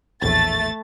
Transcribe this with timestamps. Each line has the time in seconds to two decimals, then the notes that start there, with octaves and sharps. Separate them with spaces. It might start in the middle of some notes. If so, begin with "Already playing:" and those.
0.22 A#1 E2 A2 A3 A6